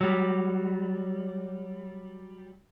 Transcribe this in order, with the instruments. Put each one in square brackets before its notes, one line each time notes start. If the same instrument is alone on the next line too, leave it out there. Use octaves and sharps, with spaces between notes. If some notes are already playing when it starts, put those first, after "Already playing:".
[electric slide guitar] F#3 G3